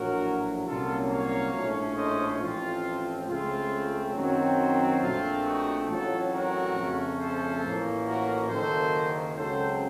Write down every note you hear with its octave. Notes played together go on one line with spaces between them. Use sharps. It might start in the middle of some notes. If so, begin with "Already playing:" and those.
Already playing: A#1 A2 F#3 F#4 A#4
C2 A#2 F#3 A#3 C#4 F4 A4
C#5 F5
A#1 A2 A3 C#4
C5 D#5
A1 A2 F3 C4 F4
C#2 C#3 A3 C4 F4
F#2 D#3 F#3 C4
A#1 A#2 A3 C4 F4
D#4 F#4
A1 A2 F#3 C4 F4 A4
F#4 A#4
F2 C#3 A3 C#4
A4 C5
A1 A2 F3 A#3 C#4
F#4 A#4
F#1 F#2 D#3 F#3 A#3 A4 C5
C#2 C#3 F#3 C4 A4 C5